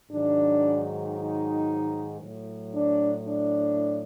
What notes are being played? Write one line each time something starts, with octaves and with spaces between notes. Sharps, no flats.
G#2 D#3 F#3 D4
D#4
A2 F#3
D4
D4